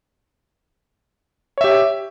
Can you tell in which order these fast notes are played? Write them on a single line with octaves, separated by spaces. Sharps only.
C#5 E5 G4